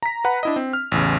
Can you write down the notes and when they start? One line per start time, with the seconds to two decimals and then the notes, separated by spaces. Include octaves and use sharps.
0.03 A#5 B6
0.24 B4 F#5 A#5 B5
0.43 D4 E4 D#5
0.56 C4
0.73 F6
0.92 A1 E2 C#3